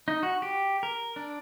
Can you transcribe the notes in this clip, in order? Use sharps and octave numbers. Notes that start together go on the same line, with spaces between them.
D#4
F#4
G4
A#4
D4